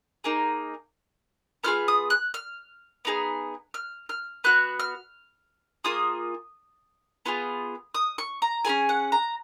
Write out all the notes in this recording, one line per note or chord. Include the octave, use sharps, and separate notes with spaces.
A#3 D#4 G#4
B3 F4 G#4 F6
D#6
F#6
F6
B3 D#4 G#4
F6
F6
B3 F#4 F#6
F6
A#3 F4 G#4 D#6
B3 F4 G#4
D#6
C#6
A#5
C#4 F4 G#4 G#5
F#5
A#5